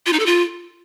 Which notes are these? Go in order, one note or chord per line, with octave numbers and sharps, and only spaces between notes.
F4
D#4
A4
F4